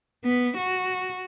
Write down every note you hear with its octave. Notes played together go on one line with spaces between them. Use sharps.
B3
F#4